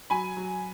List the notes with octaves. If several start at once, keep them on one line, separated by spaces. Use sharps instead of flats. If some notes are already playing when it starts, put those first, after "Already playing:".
F#3 G#5 B5
F#3